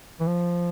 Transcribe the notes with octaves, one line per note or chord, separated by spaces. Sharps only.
E3
F3